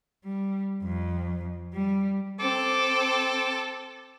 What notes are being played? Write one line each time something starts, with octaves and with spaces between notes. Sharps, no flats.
G3
F2
G3
C4 A4 D6